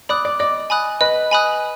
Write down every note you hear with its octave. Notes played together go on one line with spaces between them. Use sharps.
D5 B5 D#6 F#6
D5
D5 D#5
G#5 B5 D#6 F#6
B4 D#5
G#5 B5 D#6 F#6